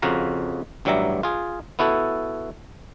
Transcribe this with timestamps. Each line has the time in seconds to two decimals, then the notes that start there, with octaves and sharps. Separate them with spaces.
0.02 F2 C#3 F#4 F5 A#5
0.85 A1 G2 F#3 G3 E5 A#5
1.23 F4 G#4
1.79 B3 E4 F#4 A4